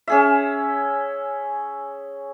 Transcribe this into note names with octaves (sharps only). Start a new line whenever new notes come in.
C#4 G#4 E5